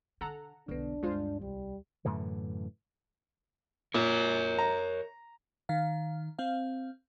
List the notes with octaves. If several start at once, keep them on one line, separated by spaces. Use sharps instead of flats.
D3 A4 F#5 A#5
E1 B1 D3 B3 D4
D2 G2 G#3 F4 C5
C2 G3
F#2 A2 D3 E3
A#2 A#4 C#5
A#5
D#3 F5
C4 F5